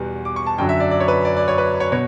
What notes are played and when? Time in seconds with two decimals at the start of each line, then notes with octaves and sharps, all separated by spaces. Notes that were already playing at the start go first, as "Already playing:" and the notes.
Already playing: E2 B2 G3 B3
0.25 D6
0.36 C#6
0.47 A5
0.58 F#2 D3 F#3 G5
0.69 E5
0.80 D5
0.91 D5
1.00 C#5
1.08 B4
1.25 D5
1.37 D5
1.48 C#5
1.58 B4
1.80 C#5
1.92 B2 C#5